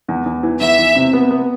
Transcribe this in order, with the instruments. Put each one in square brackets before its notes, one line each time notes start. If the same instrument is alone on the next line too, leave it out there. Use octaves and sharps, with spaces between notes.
[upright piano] E2
E2
E3
[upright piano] E2 [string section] E5
[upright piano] E3
C3
B3
B3